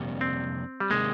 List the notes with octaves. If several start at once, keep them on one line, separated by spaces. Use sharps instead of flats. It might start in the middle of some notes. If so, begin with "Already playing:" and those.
Already playing: F2 C3 G3 A#3 D4
C4
G3
C3 D#3 G#3 A#3